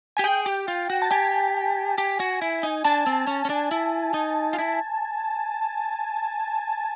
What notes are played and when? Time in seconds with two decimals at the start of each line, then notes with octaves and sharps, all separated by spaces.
0.17 G4 G#5
0.24 G#4 G5
0.46 G4
0.68 F4
0.90 F#4
1.02 A5
1.11 G4 G#5
1.98 G4
2.20 F#4
2.42 E4
2.63 D#4
2.85 D4 A5
3.06 C4
3.27 C#4
3.45 C#4
3.50 D4
3.71 E4
4.14 D#4
4.53 F4
4.58 E4